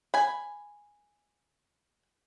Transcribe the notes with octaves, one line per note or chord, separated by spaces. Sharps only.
G#5 B5